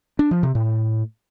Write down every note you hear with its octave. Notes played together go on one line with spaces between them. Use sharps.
D4
F3
C3
A2